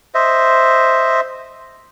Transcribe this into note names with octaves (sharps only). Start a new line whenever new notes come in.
C5 D#5 E5